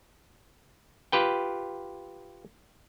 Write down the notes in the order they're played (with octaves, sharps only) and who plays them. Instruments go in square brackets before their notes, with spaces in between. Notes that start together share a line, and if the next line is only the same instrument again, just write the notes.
[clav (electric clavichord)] F4 G4 B4 G5